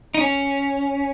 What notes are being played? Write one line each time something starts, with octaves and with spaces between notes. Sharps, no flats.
D#4
C#4